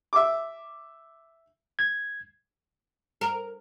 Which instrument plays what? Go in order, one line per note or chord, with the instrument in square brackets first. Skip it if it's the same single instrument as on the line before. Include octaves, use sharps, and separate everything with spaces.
[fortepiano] E5 D6
[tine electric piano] G#6
[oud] A#4